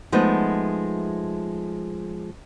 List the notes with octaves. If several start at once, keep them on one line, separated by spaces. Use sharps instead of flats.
F3 G#3 A3 B3 D#4